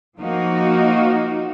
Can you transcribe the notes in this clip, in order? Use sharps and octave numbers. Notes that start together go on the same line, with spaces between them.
F3 A#3 D#4 F#4